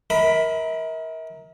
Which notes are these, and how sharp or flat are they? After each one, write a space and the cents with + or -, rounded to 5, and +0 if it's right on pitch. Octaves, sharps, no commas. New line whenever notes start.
A#4 +15 E5 -45 B5 +0